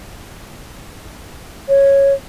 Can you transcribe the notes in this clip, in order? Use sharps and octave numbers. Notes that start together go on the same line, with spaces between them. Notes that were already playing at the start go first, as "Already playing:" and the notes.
C#5